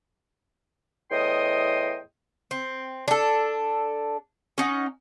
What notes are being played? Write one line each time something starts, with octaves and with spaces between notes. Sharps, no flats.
E2 A2 D#5 G5 C6 D#6
C4
D4 A4
C#4 D#4 F#5